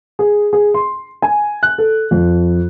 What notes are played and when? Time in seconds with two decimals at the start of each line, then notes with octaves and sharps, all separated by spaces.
0.19 G#4
0.53 G#4
0.74 C6
1.22 G#5
1.63 F#6
1.78 A4
2.11 F2